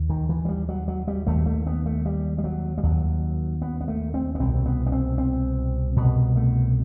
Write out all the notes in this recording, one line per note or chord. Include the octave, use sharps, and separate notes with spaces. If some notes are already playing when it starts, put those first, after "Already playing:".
Already playing: D#2
D#3
E3
F#3
G3
F#3
F#3
G3
D#2 A3
A3
B3
A3
G3
G3
F#3
G3
D#2 F#3
B3
B3
A3
C4
B3
C2 B2 C4
B3
B3
C4
C4
C2 B2 B3
A3